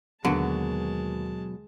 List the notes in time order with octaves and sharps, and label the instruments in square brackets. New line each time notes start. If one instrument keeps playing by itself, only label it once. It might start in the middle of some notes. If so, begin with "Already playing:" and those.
[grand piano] D#2 [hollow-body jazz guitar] B2 F#3 B3 [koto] D3 [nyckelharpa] G#3 A5